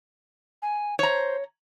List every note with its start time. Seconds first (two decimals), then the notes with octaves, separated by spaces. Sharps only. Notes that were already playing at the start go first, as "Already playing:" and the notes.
0.62 G#5
0.99 C5 C#5 A#5